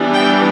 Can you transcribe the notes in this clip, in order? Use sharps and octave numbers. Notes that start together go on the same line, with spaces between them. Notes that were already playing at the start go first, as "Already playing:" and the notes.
Already playing: E3 G3 B3 D4
G5